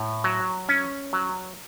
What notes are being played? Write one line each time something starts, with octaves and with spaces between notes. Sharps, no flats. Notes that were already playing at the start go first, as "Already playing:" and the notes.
Already playing: A2
F#3
C#4
F#3